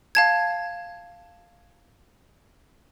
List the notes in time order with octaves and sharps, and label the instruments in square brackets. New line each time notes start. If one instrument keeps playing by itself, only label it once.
[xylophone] F5 A5 G#6